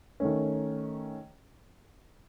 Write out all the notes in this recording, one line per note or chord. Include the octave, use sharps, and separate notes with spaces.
D#3 A3 C#4